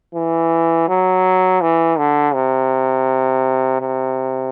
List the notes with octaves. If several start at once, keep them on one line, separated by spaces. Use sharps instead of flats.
E3
F#3
E3
D3
C3
C3